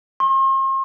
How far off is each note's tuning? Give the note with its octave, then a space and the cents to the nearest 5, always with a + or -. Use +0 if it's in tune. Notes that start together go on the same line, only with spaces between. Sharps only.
C6 +45